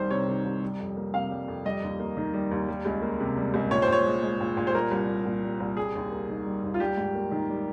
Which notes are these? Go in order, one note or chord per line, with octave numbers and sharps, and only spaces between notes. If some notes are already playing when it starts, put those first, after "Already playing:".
Already playing: C2 D#3 G3 C5
C3 C#5
D#3
C2
G3
F2
A#3
C3 F5
G3
F2
G3 D#5
D#2
A#3
D#3
G3
D#2
G3
C#2
A#3
C3
G3
C#2
A#2 C#5
C5
A#2 C#5
G#3
G#3
A#2
A#2
C5
G3 A#4
C2
A#3
A#2
G3
C2
G3 G#4
D#2
A#3
D#3
G3
D#2
F4
G3 G4
G#2
A#3
D#3
G3